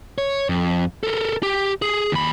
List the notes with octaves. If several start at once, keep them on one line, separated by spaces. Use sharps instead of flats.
C#5
F2
A4 A#4
G4
G#4
D#2 B5